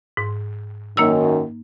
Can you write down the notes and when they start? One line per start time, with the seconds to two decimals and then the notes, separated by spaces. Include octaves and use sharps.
0.17 G#2
0.97 F#2 D#3 A#3 D#4 E6